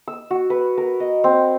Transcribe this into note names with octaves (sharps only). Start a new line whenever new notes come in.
E6
F#4
B4
A#4
D#5
C4